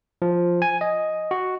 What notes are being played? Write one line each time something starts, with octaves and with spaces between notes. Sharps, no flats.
F3
G#5
D#5
F#4